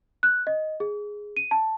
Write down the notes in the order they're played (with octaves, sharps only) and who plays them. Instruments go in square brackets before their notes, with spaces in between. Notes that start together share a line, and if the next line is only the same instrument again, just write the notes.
[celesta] F#6
D#5
G#4
D#7
A5